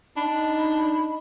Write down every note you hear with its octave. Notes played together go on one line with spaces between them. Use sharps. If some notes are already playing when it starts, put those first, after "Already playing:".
D4 D#4 B5